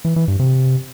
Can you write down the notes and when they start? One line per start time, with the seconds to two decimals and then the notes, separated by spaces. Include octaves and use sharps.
0.05 E3
0.16 E3
0.28 G2
0.39 C3